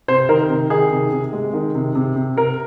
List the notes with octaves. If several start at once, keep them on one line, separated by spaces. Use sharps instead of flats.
C3 C5
D#3 A#4
C3
D#3 G#4
C3
C3
G#3
D#3
C3
C3
C3
C3 A#4